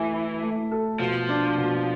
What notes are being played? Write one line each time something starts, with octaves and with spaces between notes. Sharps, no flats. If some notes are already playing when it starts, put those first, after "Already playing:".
Already playing: E3 A3 A4 E5
E4
A3
A4
B2 F3
D4
B2